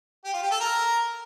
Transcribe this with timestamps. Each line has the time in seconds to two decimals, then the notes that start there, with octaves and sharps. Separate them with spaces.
0.24 G4
0.33 F4
0.42 G4
0.51 A4
0.60 A#4